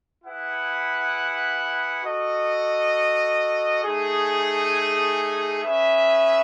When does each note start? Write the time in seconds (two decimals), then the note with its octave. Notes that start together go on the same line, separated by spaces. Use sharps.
0.24 E4 G#4 B4 F#5
2.03 F#4 A4 D#5
3.84 A3 D#4 G#4
5.63 C#4 G#4 B4 E5